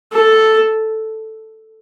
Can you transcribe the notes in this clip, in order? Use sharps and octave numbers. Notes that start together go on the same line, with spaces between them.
A4